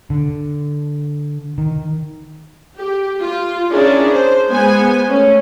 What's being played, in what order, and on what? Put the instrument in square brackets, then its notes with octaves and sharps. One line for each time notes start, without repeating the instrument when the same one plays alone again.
[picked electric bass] D3
D#3
[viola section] G4
F4
C#4 D4 E4 G#4 A#4 D5
C5
G#3 B3 C5 G#5
A3 C#4